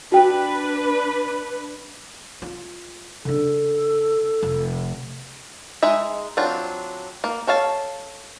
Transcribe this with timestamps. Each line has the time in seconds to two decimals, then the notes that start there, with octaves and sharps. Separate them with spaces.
0.12 D4 F#4 B4 G5
2.42 F4
3.25 C#3 D4 A4
4.42 F1
5.83 G#3 D#4 G#4 E5
6.37 F#3 C4 D4 F4
7.24 A#3
7.47 A4 C#5 F5 A5